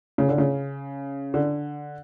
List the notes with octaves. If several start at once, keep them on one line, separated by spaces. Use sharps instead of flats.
C#3
D3
C#3
D3